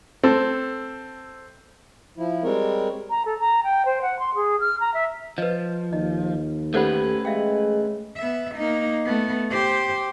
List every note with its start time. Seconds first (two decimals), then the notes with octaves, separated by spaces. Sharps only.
0.23 C4 A4
2.18 F3 E4
2.43 G3 G#3 C4 A#4 C#5
3.10 A#5
3.26 A4
3.40 A#5
3.64 G5
3.85 C5
4.02 F#5
4.19 C6
4.35 G#4
4.60 F6
4.80 A#5
4.94 E5
5.38 F3 B4 D#5
5.93 D#2 D#5
6.74 A3 C#4 G4 A4 B4 C5 F#5
7.25 G#3 E5 F5 G5
8.17 B3 E5
8.56 A#3 D#4
9.06 A3 B3
9.51 G4 C5